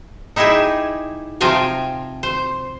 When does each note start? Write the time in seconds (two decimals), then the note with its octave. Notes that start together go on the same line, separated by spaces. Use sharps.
0.36 D#4 E4 G4 G#4 E5 G#5
1.41 C3 F3 F5 G5 G#5 A#5
2.23 C5